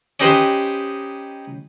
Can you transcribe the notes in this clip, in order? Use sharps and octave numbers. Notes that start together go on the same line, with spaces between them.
C#4 D#4 G4 B4 C5